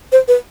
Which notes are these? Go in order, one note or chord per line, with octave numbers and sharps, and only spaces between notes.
C5
B4